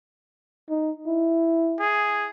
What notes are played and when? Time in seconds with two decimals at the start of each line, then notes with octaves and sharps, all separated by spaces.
0.69 D#4
1.07 E4
1.80 G#4